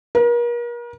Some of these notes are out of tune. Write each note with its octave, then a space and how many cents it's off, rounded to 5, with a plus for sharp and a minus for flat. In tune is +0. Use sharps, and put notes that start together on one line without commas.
A#4 +40